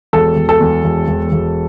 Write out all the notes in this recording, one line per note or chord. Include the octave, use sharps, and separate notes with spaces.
E1 A4
E1
A4
E2
E1
E1
E1